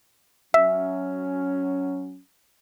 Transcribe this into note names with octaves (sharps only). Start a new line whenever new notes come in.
F#3 C#4 E5